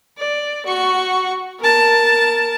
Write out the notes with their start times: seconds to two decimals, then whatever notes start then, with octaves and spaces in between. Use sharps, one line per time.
0.18 D5
0.66 F#4 C#6
1.59 A#4 A5